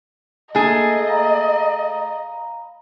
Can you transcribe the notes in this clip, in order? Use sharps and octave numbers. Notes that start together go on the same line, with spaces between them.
A3 A#3 G#4 D#5
F5 A#5 B5